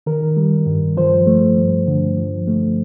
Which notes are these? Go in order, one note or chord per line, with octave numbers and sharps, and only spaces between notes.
D#3 A#4
G3
G2
F3 C5
A3
G2
D3
F3
A3